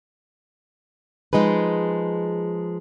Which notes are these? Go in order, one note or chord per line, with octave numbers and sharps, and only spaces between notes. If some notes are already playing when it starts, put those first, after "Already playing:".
F3 G#3 D#4 G#4 B4